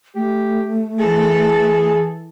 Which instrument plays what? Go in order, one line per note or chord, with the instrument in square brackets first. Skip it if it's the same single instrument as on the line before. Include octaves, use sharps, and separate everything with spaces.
[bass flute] A3 [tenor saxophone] G4
[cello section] E3 A4 [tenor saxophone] G#4